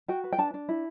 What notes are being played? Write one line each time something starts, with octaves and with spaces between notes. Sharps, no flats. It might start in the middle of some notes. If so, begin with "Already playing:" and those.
F#4 G5
B4
G5
D4 A5
D4
E4